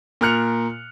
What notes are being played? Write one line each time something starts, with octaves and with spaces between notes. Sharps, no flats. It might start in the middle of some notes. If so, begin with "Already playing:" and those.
A#2 A#4 F6 F#6 C#7 F7